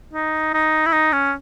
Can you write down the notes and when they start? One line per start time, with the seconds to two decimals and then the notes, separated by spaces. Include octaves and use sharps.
0.13 D#4
0.54 D#4
0.86 E4
0.92 D#4
1.13 C#4